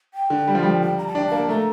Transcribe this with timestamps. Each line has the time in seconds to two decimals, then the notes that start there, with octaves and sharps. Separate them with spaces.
0.14 G5
0.30 D3
0.48 G3
0.55 F3
0.63 G3
0.82 G5
0.98 A#5
1.07 A5
1.15 D4 G5
1.27 A#3 A5
1.49 A3 A#5